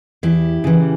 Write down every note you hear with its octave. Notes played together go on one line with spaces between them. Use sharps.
E2 E4 G4
C#3 E3